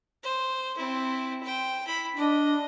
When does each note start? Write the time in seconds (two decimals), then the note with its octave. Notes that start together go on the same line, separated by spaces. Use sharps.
0.23 C5
0.77 C4 E4
1.43 C5 G5
1.87 E4 B5
2.17 D4 D#5